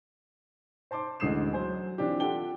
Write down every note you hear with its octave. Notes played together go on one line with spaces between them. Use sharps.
C5 A5 C6 D6
A1 D2 G#3 D#6 C7 E7
F#3 C5 G#5
E3 C4 D4 F4 G4
F4 G4 A4 F#5 G5 G7